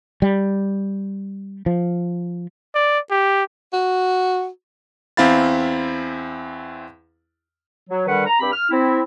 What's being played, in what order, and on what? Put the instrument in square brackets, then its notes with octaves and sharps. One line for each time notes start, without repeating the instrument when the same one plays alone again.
[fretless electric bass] G3
F3
[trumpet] D5
G4
[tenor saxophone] F#4
[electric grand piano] E2 C4 E4 F5 B5 A6
[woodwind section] F#3
D3 D#3 G3 B4 F#5
A#5
G2 C4 G4 B5
F6
C4 E4